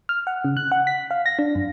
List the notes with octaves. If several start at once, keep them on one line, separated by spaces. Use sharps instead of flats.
F6
F#5
C#3
F#6
F#5
B6
F5
A#6
D4
F#2